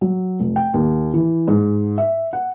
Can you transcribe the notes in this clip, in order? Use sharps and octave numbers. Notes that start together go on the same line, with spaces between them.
F#3
F1
G5
D#2
E3
G#2
E5
F#5